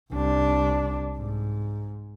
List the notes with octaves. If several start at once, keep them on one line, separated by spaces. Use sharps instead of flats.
C2 D4
G#2